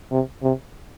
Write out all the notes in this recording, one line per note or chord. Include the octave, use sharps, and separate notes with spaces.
C3
C3